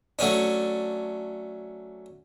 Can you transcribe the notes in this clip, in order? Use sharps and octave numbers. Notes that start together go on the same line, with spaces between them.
F#3 A3 C#4 D4